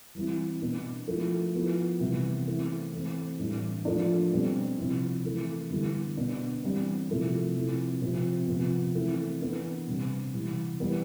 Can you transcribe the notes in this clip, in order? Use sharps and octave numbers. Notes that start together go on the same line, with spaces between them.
E3 G3 C4 E4
B2 B3 D4
F3 A3 E4
F3 B3 E4
C3 E3 G3 B3
E3 A3 C4 E4
E3 A3 C4
A2 E3 G3 D4
F3 A3 D4
B2 G3 C4
C3 F3 C4 E4
E3 A3 E4
D3 G3 B3 E4
B2 B3 D4
E3 G3 C4
C3 F3 A3 E4
C3 F3 C4 E4
C3 F3 C4
C3 F3 B3
E3 A3 C4 E4
E3 B3 D4
C3 G3 C4
C3 E3 G3
E3 G3 B3